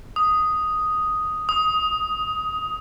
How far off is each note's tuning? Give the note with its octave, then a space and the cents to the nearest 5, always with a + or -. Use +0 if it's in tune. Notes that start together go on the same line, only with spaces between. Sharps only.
D#6 +0
D#6 +20